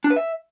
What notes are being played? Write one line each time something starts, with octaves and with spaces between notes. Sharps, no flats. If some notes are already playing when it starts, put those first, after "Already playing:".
D4
B4
E5